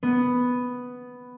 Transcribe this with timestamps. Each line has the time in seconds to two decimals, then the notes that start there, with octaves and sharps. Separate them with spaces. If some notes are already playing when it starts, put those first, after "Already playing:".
0.03 B3